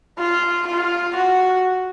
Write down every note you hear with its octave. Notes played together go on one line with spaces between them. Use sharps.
F4
F4
F#4